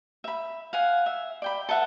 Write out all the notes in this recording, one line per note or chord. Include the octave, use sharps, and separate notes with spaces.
E5 B5
F5 F#5 G#5
E5
D5 G5 B5
A4 B4 E5 F#5